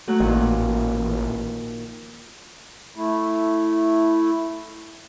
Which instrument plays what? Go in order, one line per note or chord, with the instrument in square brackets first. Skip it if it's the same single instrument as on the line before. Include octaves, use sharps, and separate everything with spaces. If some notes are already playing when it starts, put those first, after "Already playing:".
[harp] F#3 A3 F#6
[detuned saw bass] A1 [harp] A#2 D#3 F3
[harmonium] A3 E4